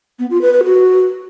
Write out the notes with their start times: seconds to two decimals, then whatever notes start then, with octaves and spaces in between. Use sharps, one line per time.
0.19 B3
0.30 F4
0.42 B4
0.53 B4
0.64 F#4